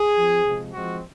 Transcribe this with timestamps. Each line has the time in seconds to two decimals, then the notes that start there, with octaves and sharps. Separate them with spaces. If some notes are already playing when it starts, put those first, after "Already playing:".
Already playing: G#4
0.17 F3 C4
0.45 C3 F3 G#3
0.73 F3 G#3 C4 F#4